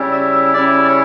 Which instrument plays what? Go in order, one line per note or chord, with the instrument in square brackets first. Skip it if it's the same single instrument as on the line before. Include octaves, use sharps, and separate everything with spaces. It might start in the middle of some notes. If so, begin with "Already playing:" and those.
Already playing: [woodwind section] C#3 G3 C#4 E4
E5
E5
C#3 G3 C#4 E4 D5
D5
C#5